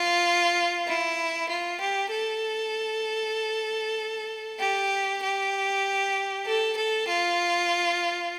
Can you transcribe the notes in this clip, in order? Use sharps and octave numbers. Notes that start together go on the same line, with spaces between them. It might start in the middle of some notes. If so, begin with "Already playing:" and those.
Already playing: F4
E4
F4
G4
A4
G4
G4
A4
A4
F4